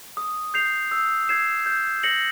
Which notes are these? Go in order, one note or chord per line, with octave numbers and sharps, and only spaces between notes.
D#6
G6 C7 F7
E6
G#6 C7 E7
G6
A#6 C#7 F#7